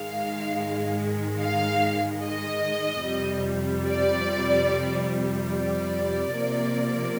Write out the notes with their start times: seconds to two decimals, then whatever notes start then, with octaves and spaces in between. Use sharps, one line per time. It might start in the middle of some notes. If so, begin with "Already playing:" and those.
Already playing: G#2 D#3 G#3 F5
1.41 F5
2.23 D#5
3.06 F2 C3 G3
3.87 D5
5.52 D5
6.34 C3 F3 A#3